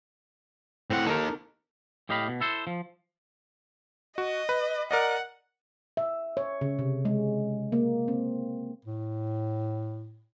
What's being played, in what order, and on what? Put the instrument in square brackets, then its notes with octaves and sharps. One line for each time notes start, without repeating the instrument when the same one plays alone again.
[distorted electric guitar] A2 F#5 [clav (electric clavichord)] C4
[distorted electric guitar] A#3 D#4 [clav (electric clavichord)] A4 A#4
[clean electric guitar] A2 G4 D#5 F5 B5
B2
E4 A4 C5
F3
[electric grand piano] F#4 [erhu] D#5
[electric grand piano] B4
[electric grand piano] A#4 D5 D#5 [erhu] F#5
[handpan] E5
C#5
C#3
C3
G#3
A#3
C4
[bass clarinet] A2